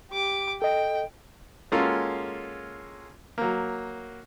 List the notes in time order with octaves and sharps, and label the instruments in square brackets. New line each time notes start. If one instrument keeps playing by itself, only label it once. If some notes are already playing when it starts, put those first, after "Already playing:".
[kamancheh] G4 D6
[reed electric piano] A4 D#5 [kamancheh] G5
[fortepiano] G#3 A#3 C#4 F4 F#4 A4
F#3 A#3